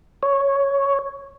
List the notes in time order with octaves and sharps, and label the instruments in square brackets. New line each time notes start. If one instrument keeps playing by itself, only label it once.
[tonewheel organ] C#5